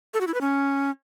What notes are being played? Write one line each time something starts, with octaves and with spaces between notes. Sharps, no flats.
A4
F#4
E4
B4
C#4